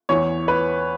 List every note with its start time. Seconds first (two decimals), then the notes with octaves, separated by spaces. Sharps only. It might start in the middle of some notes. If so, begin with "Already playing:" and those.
0.09 E2 E3 C#5
0.48 B4